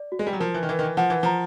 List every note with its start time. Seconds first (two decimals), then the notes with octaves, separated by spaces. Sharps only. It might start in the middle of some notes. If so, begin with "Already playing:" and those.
Already playing: D5
0.12 F#4
0.19 G#3
0.27 G3
0.33 F#3
0.40 F3 A#4
0.54 E3
0.63 D#3
0.69 E3 A#4
0.79 D#3
0.83 E3
0.97 F3 F#5
1.10 E3
1.23 F3 A#5